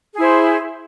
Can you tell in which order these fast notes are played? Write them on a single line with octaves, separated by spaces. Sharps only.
G#4 E4 C5